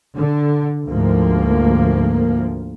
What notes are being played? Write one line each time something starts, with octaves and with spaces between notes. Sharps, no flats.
D3
D2 G#2 F3 A#3